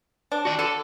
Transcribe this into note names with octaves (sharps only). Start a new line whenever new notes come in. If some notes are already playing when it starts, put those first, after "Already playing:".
D4
F#4 D5
D3 A4